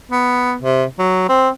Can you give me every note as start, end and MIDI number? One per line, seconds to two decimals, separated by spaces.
0.12 0.55 59
0.62 0.84 48
0.99 1.26 54
1.29 1.49 60